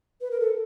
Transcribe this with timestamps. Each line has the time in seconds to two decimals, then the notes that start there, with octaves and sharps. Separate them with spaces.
0.21 B4
0.31 A#4
0.40 A4